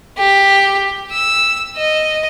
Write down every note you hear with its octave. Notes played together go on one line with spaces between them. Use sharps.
G4
E6
D#5